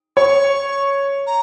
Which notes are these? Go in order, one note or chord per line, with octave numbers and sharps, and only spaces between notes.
C#5 C#6
A#5